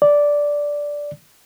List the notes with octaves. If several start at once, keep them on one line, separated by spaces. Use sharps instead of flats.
D5